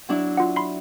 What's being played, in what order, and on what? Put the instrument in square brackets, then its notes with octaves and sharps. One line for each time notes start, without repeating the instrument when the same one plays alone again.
[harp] F#3 D4 E4
[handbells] F4 F#5
B5 C6 C7